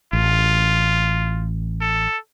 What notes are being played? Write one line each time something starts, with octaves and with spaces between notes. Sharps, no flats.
A1 F4
A4